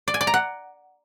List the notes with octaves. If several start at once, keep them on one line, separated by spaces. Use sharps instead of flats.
D5
G#5
D5
A#5
F#5